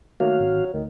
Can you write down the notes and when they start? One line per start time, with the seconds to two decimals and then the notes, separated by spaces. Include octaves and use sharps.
0.20 D#3 F#3 A3 A#3 F#4 F5
0.40 G#1
0.74 D2 D#3